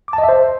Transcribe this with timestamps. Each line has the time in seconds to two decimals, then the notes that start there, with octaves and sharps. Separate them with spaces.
0.08 D6
0.13 A5
0.18 D#5
0.23 E5
0.29 C5